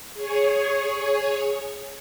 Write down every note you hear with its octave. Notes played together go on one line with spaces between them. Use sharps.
G#4 C#5